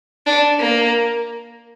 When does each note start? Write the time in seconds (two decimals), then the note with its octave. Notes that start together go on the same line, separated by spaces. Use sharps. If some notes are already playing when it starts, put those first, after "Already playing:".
0.27 D4
0.59 A#3